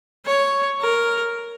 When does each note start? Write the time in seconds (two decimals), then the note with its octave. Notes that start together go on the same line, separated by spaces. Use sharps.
0.25 C#5
0.81 A#4